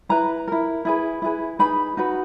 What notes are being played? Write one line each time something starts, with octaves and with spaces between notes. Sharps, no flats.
E4 B4 A#5
E4 A#4
E4 G#4 B4
E4 G#4 B4
D#4 G#4 B4 B5
D#4 F#4 B4